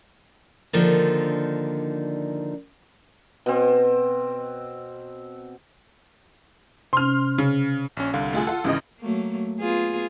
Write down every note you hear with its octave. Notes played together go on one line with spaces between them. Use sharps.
D3 D#3 F3 A#3 D4 D#4
B2 C4
C3 C#4 C6 F6
C#3
A#1 C#4
C2 D3 F5
A3 F4 G#4
F4 A4 F#5
G#1 C#3 E3 D#5
F#3 A3 A#3
B3 F4 G#4